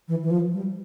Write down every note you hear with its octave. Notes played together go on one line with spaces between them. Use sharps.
E3
E3
F3
G3